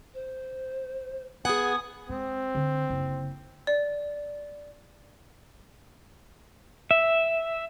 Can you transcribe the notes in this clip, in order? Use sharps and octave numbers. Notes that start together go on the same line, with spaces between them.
C5
B3 G#4 F#5 G#5 D#6
G#3 C4
D3
F#1
D5
E5